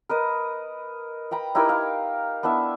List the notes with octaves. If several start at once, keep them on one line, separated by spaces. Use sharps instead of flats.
A#4 B4 D#5
B4 G5 A#5 B5
D#4 E4 G4 A#4
F5
B3 D4 E4 E5